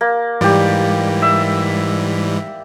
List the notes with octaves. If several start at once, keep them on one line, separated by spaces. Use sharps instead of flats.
A#3
G#2 E3 G3 G4 D5
E5